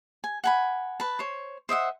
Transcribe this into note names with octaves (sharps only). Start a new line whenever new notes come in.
G#5
F#5 G#5 B5
B4 A5
C5 C#5
C5 D#5 E5 F#5